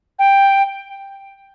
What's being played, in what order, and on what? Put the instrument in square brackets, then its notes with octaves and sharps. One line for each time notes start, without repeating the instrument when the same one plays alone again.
[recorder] G5